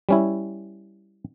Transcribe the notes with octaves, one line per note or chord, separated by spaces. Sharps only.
G3 C#4 E4